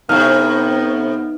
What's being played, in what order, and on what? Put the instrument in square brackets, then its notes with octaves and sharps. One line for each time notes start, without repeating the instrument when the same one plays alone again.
[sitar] A2 C3 [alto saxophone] B3 [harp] D#4 [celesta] F6